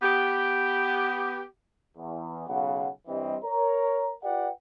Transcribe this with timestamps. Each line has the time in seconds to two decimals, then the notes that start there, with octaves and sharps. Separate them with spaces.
0.02 B3 G4
1.97 E2
2.48 B1 C#3 F5 F#5
3.07 G2 E3 G3 C4 D#5
3.44 A#4 C#5 A#5
4.23 F4 G4 B4 D5 F#5 G5